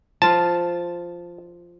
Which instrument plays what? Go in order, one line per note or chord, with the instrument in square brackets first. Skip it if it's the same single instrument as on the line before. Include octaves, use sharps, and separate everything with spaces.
[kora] F3 F4 [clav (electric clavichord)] A5